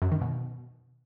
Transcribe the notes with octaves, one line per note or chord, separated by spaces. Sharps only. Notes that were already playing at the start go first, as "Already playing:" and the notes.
F#2
D#3
B2